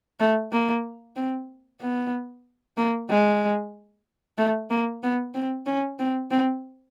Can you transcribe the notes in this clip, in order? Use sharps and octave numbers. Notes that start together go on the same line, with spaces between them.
A3
A#3
C4
B3
A#3
G#3
A3
A#3
B3
C4
C#4
C4
C4